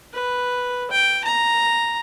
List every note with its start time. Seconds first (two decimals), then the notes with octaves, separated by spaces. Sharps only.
0.13 B4
0.91 G5
1.24 A#5